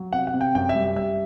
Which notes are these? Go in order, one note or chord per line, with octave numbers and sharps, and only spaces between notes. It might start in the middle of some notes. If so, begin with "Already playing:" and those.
Already playing: F#3
C3 F#5
F#5
C3
G5
F#2 G5
E5
G3
G3 E5